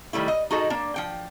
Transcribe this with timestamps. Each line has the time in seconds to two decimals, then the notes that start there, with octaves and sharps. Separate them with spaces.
0.13 D#3 G3 A3 E4
0.28 D#5
0.51 D#4 F#4 G#4 A4 D#5
0.70 A#3 D4
0.96 F3 G5